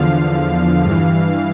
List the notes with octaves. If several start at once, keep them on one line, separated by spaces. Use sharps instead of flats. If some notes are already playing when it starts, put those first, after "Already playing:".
Already playing: E2 D3 F3 F5
G2
E3